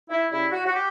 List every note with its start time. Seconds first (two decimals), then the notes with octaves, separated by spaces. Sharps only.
0.09 E4
0.30 C#3 G3 E4
0.51 F#4
0.65 F#4
0.72 G4